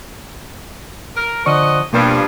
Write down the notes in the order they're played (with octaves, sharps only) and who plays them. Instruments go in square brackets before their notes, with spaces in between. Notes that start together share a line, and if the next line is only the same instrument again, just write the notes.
[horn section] A#4
[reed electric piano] D3 D5 C#6 [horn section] F3 D#5 F#5
[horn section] G2 F3 [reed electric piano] B2 A#3